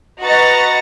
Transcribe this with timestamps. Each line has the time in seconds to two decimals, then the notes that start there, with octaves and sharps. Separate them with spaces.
0.21 F#4 B4 D#5 A#5 A6 C#7